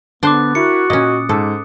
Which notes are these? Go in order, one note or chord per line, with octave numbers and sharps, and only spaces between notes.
D3 B3 D4 C5 D6 F#6 A6
E4 F#4 A#4 C#7
A#2 C#4 D#5 D#6
G#2 A4